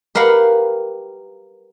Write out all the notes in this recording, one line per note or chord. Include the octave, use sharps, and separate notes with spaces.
G4 A#4 B4 F5 F#5